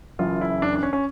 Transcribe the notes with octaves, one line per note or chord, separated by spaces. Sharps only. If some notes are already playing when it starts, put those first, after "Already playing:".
F#1 F#2 C#3 E3 F4
E4
D4
D4
C#4
C#4